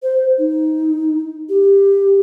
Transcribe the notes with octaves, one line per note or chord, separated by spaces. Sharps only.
C5
D#4
G4